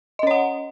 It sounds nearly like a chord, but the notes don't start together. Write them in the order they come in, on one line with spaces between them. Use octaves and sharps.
D#5 C#4 C#5 F#5